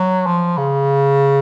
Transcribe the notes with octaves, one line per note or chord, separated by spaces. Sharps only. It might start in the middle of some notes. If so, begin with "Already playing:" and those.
Already playing: F#3
F3
C#3